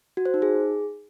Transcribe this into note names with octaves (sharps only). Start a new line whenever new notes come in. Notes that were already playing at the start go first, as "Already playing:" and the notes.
F#4
C5
D#4
G#4